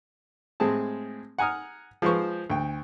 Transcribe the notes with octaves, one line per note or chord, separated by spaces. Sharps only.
A2 G#3 C4 G#4 A5
F#5 G#5 A#5 D#6 F6
F3 G#3 B4 C5 C#6
D2 G5